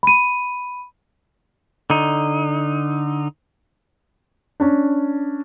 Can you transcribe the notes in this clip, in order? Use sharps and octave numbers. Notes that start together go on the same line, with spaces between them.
B5 D#7
D3 D#4
C#4 D4